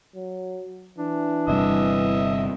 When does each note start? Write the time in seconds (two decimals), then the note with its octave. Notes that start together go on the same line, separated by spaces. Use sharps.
0.15 F#3
0.98 E3 D4
1.48 G1 C3 G3 D#5 E5